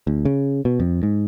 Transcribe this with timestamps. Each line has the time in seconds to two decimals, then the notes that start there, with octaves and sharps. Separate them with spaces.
0.07 D2
0.25 C#3
0.65 B2
0.80 F2
1.03 G#2